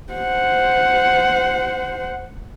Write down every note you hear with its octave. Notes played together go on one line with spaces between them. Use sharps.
C5 F#5